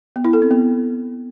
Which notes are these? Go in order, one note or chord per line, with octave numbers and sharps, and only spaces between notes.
B3
E4
A4
C4
B3